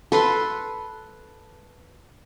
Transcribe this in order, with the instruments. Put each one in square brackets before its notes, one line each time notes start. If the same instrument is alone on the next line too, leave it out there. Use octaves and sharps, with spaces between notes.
[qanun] A4 B4 C6